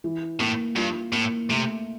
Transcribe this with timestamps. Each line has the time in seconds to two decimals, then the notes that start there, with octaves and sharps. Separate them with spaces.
0.04 E3
0.40 A2 A#3
0.76 G2 F4
1.13 A2 A#3
1.50 C3 A3